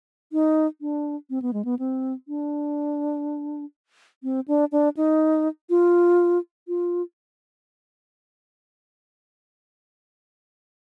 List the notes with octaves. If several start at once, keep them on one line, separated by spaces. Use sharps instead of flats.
D#4
D4
C4
B3
G#3
B3
C4
D4
C4
D4
D4
D#4
F4
F4